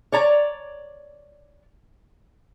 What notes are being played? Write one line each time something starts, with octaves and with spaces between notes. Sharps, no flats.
C#5 D5 A#5